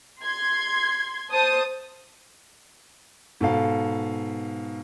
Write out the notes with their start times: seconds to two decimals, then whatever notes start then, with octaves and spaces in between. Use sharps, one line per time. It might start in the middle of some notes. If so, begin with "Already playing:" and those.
0.23 C6 G#6
1.32 C5 A5 D#6
3.41 G#2 B2 A4 F5